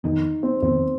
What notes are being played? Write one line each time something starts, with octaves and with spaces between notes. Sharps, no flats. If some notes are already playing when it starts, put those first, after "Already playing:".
F2 D#3 B3 D#4
C4
F2 D#3 B3 C4